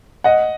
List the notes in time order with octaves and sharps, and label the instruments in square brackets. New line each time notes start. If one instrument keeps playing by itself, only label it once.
[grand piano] D#5 F#5